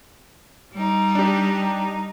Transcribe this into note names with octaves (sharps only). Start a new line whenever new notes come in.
G3 D#4
D4 G4